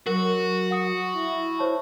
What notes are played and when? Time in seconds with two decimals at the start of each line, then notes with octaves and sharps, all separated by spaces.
0.07 F#3 F#4 A#4
0.71 F#5 D#6 C#7
1.13 E4
1.59 C5 C#5 A5